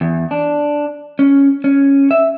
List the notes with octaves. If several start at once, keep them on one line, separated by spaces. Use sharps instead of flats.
E2
D4
C#4
C#4
E5